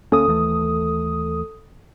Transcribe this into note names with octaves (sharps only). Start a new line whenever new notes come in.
D2 A#3 C#4 A4 D#6
D#2 E3 A3